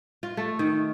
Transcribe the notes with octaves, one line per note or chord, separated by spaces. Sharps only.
F4
A3
D#3